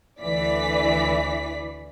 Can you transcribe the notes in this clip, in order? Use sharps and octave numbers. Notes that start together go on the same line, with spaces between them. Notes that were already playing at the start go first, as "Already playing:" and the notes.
D2 E3 D5 B6